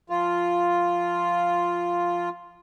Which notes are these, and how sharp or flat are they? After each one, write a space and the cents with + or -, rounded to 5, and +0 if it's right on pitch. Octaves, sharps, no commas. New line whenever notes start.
F3 +0 F4 +0